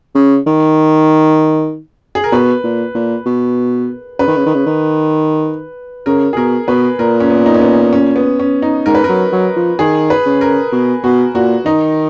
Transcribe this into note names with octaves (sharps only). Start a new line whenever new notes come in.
C#3
D#3
G#4
A#4
B2 B4
A#2
A#2
B2
C#3 B4
D#3
C#3
D#3
C#3
D#3
C#3 A#4
G#4
B2 A#4
B2 B4
A#2 A#4
C#4
B3
D#4
C#4
B3
C#4
B3
C#4
D#4
G#2 A#4
B4
F#3 A#4
F#3
F3
D#3 G#4
B4
C#3
A#4
B2
B2 F#4
A#2 F#4
D#3 D#4